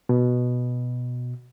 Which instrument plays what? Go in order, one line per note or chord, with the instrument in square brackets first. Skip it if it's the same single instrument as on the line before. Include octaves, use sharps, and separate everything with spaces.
[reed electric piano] B2